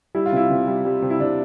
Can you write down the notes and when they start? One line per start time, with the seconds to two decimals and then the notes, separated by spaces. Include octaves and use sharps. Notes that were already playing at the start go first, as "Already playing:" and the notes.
0.15 G3 E4
0.26 F4
0.32 C3 E4
0.50 C3
0.67 G3
0.85 G3
1.02 C3
1.10 E4
1.20 C3 D4